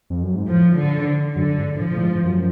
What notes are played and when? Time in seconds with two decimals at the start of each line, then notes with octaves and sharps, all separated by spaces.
0.10 F2
0.23 F#2
0.35 G#2
0.48 A2 F3
0.77 D3
1.35 F#2 D3
1.58 G#2
1.80 A2 F3
1.96 A2
2.02 G#2
2.23 F#2